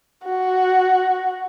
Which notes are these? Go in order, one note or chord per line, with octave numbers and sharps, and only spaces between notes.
F#4